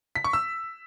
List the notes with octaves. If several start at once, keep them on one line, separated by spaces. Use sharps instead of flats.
B6
C#6
E6